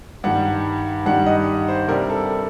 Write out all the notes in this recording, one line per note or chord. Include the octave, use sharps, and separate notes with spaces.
G2 D#3 G3 F#5
G2 D#3 G3 D4 F#5
D#5
C5
C3 G3 D4 A#4
A4